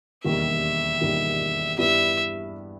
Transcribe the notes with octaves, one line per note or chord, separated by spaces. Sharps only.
E1 D#2 D#3 G3 E5
E1 D#2 D#3 G3
G2 G3 B3 E4 E5